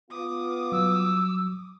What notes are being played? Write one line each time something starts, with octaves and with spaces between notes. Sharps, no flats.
B3 F4 D6 D#6
F#3 E6